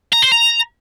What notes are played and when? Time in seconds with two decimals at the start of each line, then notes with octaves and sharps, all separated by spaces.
0.13 A#5
0.22 C5
0.31 A#5